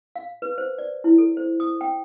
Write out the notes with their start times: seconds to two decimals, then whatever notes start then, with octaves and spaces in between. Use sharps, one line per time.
0.16 F5
0.42 B4
0.58 C5
0.78 D5
1.04 E4
1.18 A4
1.37 C5
1.60 D#6
1.81 G5